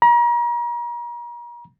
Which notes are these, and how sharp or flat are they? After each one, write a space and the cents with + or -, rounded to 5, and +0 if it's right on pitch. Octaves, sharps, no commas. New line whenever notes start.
A#5 +40